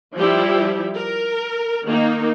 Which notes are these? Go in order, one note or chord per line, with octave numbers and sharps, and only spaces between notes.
F3 G3 E4 G4
A#4
D#3 A#3 D#4